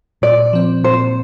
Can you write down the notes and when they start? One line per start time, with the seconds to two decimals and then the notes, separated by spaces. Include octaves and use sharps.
0.22 A#2 D5
0.53 F3 C4
0.84 A#2 C5